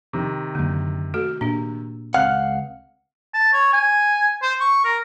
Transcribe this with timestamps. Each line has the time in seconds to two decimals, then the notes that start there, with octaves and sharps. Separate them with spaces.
0.13 C3 D#3
0.55 F#2 D3 A#3
1.14 A3 F#4 A4
1.41 A#2 D4 G4
2.14 C#2 C4 F5 F#5 F6 F#6
3.34 A5
3.53 C#5
3.73 G#5
4.43 C5
4.60 C#6
4.85 A#4